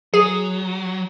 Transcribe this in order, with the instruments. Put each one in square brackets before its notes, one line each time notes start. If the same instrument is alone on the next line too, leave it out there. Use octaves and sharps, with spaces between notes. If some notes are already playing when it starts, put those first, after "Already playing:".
[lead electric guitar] F#3 [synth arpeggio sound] G#4